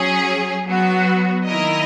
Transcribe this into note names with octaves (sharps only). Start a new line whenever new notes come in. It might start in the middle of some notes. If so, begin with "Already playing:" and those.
Already playing: F#3 C#4 G#4
F#3 B3 F#4
D#3 A#3 E4 A#4 D#5